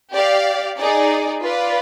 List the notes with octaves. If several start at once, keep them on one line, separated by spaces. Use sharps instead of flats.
G4 D5 F5
D#4 G#4 D5
F4 B4 D5